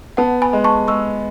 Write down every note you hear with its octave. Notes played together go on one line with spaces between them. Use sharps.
B3 F#5 A5
G#5 B5
G#3
A5 C#6
G#3 C#6 E6